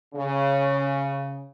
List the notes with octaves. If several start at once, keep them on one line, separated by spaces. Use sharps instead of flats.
C#3